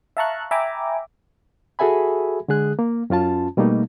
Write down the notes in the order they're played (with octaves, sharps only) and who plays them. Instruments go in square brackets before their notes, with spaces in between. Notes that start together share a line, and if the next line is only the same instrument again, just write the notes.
[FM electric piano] E5 F5 A5 A#5 C#6 F#6
E5 G5 G#5 A#5 B5 D6
[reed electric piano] F#4 G#4 A4 E5 G#5 B5
D3 G#3 G#4 F#6
A#3
F#2 C#4 F4 A5
B2 G3 A3 A#3 D#4